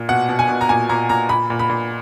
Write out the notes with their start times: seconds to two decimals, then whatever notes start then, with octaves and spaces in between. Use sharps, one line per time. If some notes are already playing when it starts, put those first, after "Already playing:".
Already playing: A#2
0.09 B2 F#5
0.29 B2
0.39 G#5
0.49 B2
0.61 A#5
0.69 A#2 G#5
0.89 A#2 A#5
1.09 A#2 A#5
1.29 A#2 B5
1.50 A#2
1.59 B5
1.70 A#2